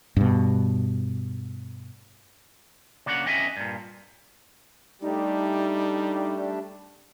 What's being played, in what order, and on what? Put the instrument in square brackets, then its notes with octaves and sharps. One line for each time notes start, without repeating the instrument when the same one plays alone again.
[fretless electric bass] G2 B2
[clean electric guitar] C#3 A#3 D4 C#5 F#5
C4 C#4 D#5 E5 G#5
G2 A#2
[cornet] G3 [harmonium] A3 D4 G4 [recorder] D#4